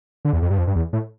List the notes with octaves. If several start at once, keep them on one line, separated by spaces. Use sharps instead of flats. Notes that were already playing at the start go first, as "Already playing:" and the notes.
D3
E2
F2
G2
F2
G2
E2
A2